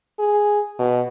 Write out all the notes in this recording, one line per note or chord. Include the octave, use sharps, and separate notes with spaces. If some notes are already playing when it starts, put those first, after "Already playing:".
G#4
B2